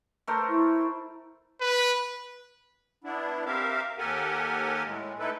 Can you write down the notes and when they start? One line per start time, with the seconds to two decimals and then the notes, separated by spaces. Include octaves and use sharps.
0.27 A3 A#4 C5
0.49 E4
1.61 B4
3.04 B3 D4 E4
3.46 C4 G4 A#4 E5 F5
3.98 D#2 G4 A4 A#4 F#5 G#5
4.86 A2 G#3
5.19 A3 D#4 E4 A4 B4